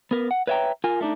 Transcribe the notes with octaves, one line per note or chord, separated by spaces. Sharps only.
B3 A#4 B4
F#5
B4 C#5 E5 F5 G5 A#5
F4 A#4 G#5
A3 D4 D#4